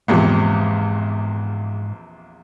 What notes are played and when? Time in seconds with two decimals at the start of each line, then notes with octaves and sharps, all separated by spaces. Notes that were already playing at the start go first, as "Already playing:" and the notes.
0.08 A#1 E2 G#2 C3